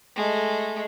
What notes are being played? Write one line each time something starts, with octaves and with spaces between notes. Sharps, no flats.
G#3 A3